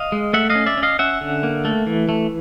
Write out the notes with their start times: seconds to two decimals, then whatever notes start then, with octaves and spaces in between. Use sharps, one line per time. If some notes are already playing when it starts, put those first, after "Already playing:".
Already playing: D#5 F5
0.12 G#3
0.33 A3 E5 F#5
0.50 D#5 F5
0.55 C#4
0.66 D5 E5
0.77 C#4
0.83 D#5 F5
0.99 C#4 E5 F#5
1.21 D3
1.43 A#3
1.65 A3
1.87 E3
2.09 A3